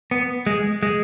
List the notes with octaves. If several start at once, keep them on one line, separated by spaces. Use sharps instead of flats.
B3
G#3
G#3